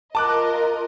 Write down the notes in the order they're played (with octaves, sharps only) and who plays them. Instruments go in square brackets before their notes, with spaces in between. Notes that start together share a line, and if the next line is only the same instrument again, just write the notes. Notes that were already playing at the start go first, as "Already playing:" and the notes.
[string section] F4 A#4 D#5 [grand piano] A5 D6 F#6